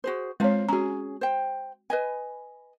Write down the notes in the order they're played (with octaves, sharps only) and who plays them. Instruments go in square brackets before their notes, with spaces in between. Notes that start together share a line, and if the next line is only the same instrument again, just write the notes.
[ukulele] F#4 G#4 C5
[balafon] G#3 C4 C#5 [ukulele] F4 C5 F5
[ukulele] C#4 G#4 [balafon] F#4 A#5
[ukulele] C5 G5
B4 D#5 G#5